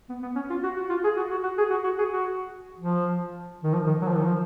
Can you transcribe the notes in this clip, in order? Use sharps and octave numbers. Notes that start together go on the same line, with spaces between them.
B3
B3
C#4
F4
F#4
F#4
F4
G#4
F#4
F#4
F#4
G#4
F#4
F#4
G#4
F#4
F3
D#3
F3
D#3
F#3
F3
D#3
F3